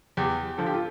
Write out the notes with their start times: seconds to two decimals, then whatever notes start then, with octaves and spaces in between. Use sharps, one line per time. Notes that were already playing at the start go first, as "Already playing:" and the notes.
0.17 E2 G4
0.57 D3 F3 A4
0.66 G4
0.74 F4